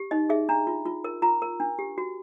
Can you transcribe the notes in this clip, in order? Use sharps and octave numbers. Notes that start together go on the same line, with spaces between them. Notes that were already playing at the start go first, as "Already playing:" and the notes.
Already playing: G4
D#4 D#5
G#4 E5
D4 A#5
F4
F4
A#4
F4 A#5
A#4
D4
G4
F#4